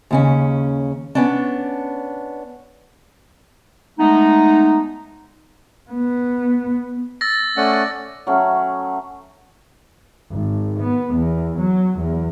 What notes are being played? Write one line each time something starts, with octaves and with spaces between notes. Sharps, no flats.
D#2 C#3 C#4
B3 C#4 D4
G#3 A3 B3 D#4
B3
E6 A6 A#6
A3 C#4 D5 F#5
F#3 A3 C#4
G#1
B3
E2
F#3
E2